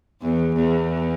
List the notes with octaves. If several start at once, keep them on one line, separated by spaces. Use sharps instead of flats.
E2
E2